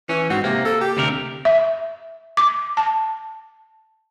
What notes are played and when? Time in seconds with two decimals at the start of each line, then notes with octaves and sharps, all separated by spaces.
0.09 E3 C#4
0.30 G#2 C4 F#4
0.44 C3 A#3
0.65 A4
0.81 G4
0.97 D2 C3 A#4
1.45 E5
2.37 D6
2.77 A5